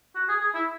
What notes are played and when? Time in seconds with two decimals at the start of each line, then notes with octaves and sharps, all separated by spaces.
0.15 F#4
0.29 G#4
0.41 G#4
0.54 E4